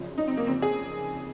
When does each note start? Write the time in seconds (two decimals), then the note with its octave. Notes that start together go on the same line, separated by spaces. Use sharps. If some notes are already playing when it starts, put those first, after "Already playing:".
Already playing: G#1 F#2 C#3 F3
0.18 D#4
0.28 C4
0.37 A#3
0.47 F1 F2 C#3 C4
0.62 G#4